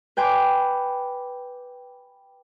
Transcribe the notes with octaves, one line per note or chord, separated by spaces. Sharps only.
B4 G5 G#5 C6 D6